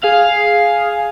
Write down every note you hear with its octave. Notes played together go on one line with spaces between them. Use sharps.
G#4 F5